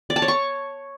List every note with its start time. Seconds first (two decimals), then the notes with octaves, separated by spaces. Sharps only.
0.10 D5
0.16 A5
0.22 C#5
0.28 C#6